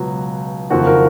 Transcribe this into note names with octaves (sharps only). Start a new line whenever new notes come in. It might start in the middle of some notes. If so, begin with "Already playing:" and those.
Already playing: C#2 B2 F#3
F#1 F2 D#3 A#3 F#4
A#4